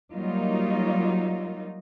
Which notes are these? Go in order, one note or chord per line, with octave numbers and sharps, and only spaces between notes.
F#3 G3 A#3 D#4 F4